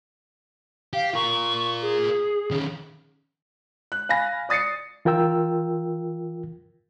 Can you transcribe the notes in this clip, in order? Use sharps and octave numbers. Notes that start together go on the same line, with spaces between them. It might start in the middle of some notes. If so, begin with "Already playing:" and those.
G4 F5
F4 A#4 C#6
G#4
D#3 C#4
F#6
F5 G#5 B5 A#6
D5 D#6 A6 C7 C#7
E3 F4 A#4 G5 E6